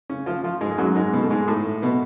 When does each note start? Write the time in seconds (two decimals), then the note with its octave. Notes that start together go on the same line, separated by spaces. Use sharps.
0.10 C#3 C#4
0.26 F3 F4
0.44 F3 F4
0.61 G#2 G#3
0.71 G#3
0.78 F#2 F#3
0.95 G#2 G#3
1.13 B2 B3
1.22 A3
1.30 G#2 G#3
1.48 A2 A3
1.82 B2 B3